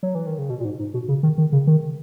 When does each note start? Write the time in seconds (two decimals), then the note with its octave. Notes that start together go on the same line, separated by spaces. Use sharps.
0.03 F#3
0.15 E3
0.27 D#3
0.38 C#3
0.50 B2
0.59 A#2
0.65 G#2
0.79 G#2
0.94 B2
1.08 C#3
1.23 D#3
1.38 D#3
1.52 C#3
1.67 D#3